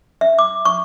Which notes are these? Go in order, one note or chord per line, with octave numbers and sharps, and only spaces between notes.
E5
D6
C#6